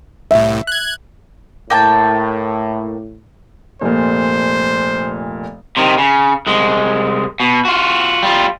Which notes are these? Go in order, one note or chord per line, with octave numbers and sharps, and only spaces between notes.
C2 A2 E5
F#6 G#6
A2 A#3 G5 A5
F1 A#2 C5
C3 D#3
C#3
C2 G#3
B2
F4 F#4
G3 F4